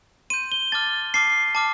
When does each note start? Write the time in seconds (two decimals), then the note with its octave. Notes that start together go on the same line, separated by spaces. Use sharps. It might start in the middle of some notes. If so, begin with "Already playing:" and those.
0.30 C6 G6 D#7
0.52 G7
0.72 A5 D6 F6 A6
1.14 A5 D6 F6 C7
1.55 A5 D6 F6